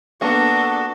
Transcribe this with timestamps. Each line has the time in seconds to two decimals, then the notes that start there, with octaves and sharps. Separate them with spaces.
0.21 A#3 B3 D4 F#4 A4